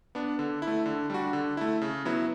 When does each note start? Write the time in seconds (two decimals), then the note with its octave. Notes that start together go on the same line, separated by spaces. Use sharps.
0.15 B3 D4
0.39 D3
0.62 E4
0.67 A3
0.86 D3
1.10 G3 D4 F#4
1.33 D3
1.57 A3 E4
1.82 C#3
2.05 F#3 B3 E4